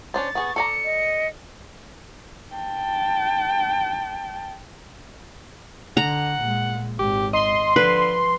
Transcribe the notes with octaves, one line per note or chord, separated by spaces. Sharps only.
C#4 D4 C5 A6
B3 G#4 C#6
A4 D5 A#5 C#7
D#5
G5 A5
D3 F#5 A#5
A#2 G#3
G#1 G4
D#5 C6
D3 F3 B4